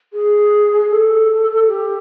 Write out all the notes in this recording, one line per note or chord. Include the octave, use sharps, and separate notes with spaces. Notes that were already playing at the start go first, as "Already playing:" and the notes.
G#4
A4
G4